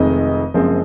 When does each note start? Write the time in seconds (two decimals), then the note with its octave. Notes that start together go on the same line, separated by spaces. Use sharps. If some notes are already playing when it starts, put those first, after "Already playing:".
Already playing: F1 F2 D#3 G#3 D#5
0.54 F#1 F#2 F3 G#3 C4